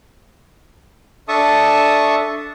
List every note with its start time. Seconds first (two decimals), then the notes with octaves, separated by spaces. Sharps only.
1.28 D4 A4 E5 A5 C#6 D#6